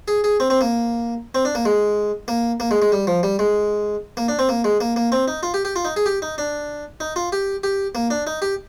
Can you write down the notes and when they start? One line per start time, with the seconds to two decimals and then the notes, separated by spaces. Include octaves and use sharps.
0.08 G#4
0.24 G#4
0.40 C4
0.50 C4
0.61 A#3
1.35 C4
1.45 D4
1.55 A#3
1.65 G#3
2.28 A#3
2.60 A#3
2.71 G#3
2.82 G#3
2.92 G3
3.07 F3
3.23 G3
3.39 G#3
4.17 A#3
4.28 D4
4.39 C4
4.49 A#3
4.64 G#3
4.81 A#3
4.96 A#3
5.12 C4
5.28 D#4
5.43 F4
5.54 G4
5.65 G4
5.76 F4
5.85 D#4
5.96 G#4
6.06 G4
6.22 D#4
6.38 D4
7.00 D#4
7.16 F4
7.32 G4
7.64 G4
7.95 A#3
8.10 D4
8.27 D#4
8.42 G4